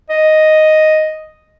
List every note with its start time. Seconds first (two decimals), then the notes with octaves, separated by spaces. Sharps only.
0.10 D#5